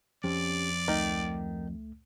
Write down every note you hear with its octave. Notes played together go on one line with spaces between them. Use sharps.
F2 C#4 G4 D5
C#2 D#3 A3